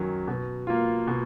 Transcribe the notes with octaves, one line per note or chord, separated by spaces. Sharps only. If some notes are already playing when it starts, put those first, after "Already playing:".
Already playing: F#2 D#3 F#3
B2
A#3 F4
B2